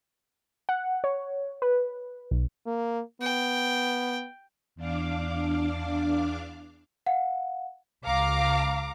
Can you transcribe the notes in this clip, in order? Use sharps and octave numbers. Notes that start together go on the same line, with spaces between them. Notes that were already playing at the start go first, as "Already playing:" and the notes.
F#5
C#5
B4
B1
A#3
B3 G5
E2 D4 F5 D6
F5 F#5
C#2 F5 A#5 D6